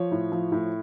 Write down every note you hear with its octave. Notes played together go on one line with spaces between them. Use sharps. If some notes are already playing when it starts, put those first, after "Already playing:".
Already playing: F3 C#5
A2
F3
A2